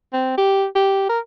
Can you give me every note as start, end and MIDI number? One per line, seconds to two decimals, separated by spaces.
0.13 0.35 60
0.38 0.65 67
0.75 1.05 67
1.09 1.19 70